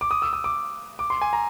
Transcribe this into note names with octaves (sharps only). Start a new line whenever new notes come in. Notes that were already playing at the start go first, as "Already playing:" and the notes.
D6
D#6
E6
D#6
D6
D6
C6
G#5
A#5